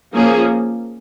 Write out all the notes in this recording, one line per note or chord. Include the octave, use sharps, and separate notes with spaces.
F3 A#3 C#4 G#4